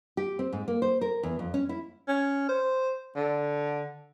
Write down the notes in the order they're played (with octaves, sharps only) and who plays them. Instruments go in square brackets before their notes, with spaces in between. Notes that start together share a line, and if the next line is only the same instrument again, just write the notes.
[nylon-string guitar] G4
C4
G#2
A#3
C5
A#4
E2
F2
C#4
E4
[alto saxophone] C#4
C5
D3